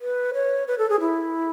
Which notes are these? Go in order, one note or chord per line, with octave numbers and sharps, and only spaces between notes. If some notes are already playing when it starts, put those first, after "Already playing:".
B4
C#5
B4
A4
G#4
E4